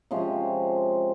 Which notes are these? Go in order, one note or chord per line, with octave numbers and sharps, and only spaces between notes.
C3 F3 G#3 C#4